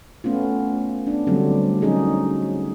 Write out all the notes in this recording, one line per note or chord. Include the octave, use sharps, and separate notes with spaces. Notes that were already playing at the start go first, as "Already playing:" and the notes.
A3 B3 C#4 F4
B3 D4
D3 F#3 G3 A3 C4
F#3 C#4 D#4 G#4